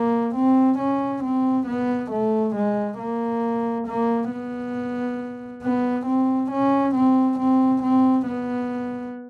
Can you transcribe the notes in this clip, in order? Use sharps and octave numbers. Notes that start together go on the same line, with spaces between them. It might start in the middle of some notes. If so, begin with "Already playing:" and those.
Already playing: A#3
C4
C#4
C4
B3
A3
G#3
A#3
A#3
B3
B3
C4
C#4
C4
C4
C4
B3